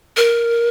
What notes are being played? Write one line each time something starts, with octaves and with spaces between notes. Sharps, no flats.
A#4